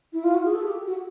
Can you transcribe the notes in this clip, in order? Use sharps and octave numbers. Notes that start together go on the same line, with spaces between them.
E4
F4
F#4
G#4
A4
G4
F#4